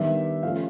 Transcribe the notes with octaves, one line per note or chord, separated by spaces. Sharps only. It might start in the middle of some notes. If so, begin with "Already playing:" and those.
Already playing: D#3 G3 B3 D4 E5
F3 A3 C#4 F5